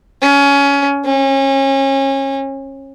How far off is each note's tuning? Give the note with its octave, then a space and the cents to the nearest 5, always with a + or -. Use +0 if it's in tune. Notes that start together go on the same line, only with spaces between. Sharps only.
C#4 +20
C#4 -30